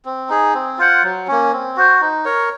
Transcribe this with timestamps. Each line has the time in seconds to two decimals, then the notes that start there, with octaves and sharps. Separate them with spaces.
0.05 C4
0.29 D#4 G#4
0.54 C4
0.78 F4 C5 F#5
1.03 F#3
1.27 A#3 C#4
1.52 C4
1.77 F#4 C5
2.01 D#4
2.25 A#4 C#5